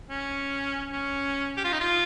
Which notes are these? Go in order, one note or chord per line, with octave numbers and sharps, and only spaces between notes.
C#4
C#4
G4
F4
D#4
F4